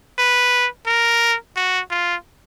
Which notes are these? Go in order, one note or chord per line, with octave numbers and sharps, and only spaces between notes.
B4
A#4
F#4
F4